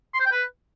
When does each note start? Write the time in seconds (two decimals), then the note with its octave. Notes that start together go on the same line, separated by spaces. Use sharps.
0.14 C6
0.20 C5
0.26 G5
0.31 B4